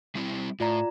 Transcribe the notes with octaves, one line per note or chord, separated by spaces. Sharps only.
G3 C4 E4
A2 F4 D5 A#5